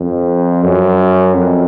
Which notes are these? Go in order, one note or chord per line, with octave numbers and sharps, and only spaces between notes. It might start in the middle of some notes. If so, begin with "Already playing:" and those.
Already playing: F2
F#2
F2